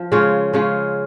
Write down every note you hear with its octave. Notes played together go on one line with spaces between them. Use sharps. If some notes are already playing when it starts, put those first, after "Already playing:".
Already playing: F3
C#3 G#3 C#4 F4
C#3 G#3 C#4 F4